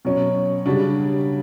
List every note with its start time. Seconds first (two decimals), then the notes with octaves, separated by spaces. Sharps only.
0.05 B2 F#3 C#4
0.66 C#3 G3 D4 F#4